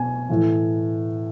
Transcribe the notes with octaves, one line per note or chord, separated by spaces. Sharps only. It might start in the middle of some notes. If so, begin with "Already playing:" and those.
Already playing: B2 G#5
A2 E3